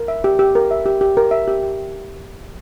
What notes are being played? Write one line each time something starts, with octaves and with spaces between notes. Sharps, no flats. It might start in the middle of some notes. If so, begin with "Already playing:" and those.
Already playing: A#4
E5
G4
G4
A#4
E5
G4
G4
A#4
E5
G4
G4